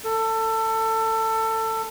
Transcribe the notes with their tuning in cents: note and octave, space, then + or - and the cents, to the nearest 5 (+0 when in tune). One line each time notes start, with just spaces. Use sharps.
A4 +20